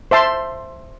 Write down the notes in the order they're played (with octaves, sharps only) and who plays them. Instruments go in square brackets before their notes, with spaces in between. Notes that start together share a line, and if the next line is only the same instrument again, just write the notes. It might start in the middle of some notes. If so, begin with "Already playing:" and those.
[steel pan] C5 E5 A5 C6